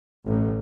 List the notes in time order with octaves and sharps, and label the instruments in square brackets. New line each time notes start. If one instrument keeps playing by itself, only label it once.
[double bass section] A1